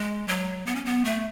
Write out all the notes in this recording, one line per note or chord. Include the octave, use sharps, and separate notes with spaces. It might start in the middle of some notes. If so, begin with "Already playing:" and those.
Already playing: G#3
F#3
B3
C#4
B3
A3